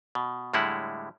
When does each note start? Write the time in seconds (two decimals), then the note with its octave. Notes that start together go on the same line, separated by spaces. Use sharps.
0.15 B2
0.54 A2 D3 G3 G#3 E4 F#5